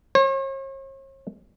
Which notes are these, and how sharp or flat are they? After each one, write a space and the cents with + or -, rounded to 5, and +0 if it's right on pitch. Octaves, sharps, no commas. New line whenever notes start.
C#5 -45